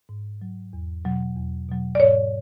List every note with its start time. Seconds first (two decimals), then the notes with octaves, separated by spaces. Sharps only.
0.09 G#2
0.41 F#3
0.73 E2
1.04 B2 F#3
1.36 E2
1.69 B2 F#3
1.95 D5
1.99 G#2 C#5